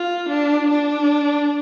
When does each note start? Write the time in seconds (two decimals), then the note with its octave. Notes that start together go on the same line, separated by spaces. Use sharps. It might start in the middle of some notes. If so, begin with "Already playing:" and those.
Already playing: F4
0.29 D4
0.70 D4